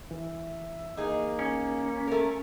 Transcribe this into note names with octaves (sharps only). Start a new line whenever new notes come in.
E3 E5
A#3 D#4 G#4
C#4
A3 A#4